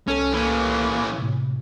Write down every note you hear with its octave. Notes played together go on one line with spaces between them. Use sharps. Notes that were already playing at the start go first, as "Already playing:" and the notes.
C2 C#4 A4
E3 A#3 C#4
A2 C3